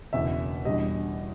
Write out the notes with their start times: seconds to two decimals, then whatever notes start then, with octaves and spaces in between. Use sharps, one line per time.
0.13 F#1 E2 B2 E5
0.65 E2 B2 G3 D#5